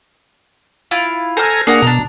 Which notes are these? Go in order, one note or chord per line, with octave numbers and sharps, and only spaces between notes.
E4 F4
A4 C5 G#5 A#5 F6
A#3 D4 G#4 A#4 F#5
B2 D4 A#5